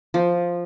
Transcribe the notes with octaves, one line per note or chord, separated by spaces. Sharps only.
F3